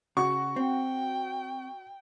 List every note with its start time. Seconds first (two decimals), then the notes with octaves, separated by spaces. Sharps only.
0.17 C#3 F#4 C#6
0.56 C4 G5